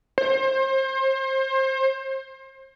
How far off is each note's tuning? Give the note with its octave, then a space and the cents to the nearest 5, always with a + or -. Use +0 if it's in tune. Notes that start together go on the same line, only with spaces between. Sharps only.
C5 +30